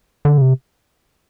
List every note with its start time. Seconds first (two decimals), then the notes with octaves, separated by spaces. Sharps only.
0.25 D3
0.38 C#3
0.41 C3